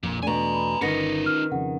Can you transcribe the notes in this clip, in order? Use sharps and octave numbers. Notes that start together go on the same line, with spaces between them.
A#1 F2 A#2
E2 B2 A3 D4 G#5 A#5
B5
G1 D#3 B3 C#4 D#4 A#6 C#7
F6
F2 C#3 F#5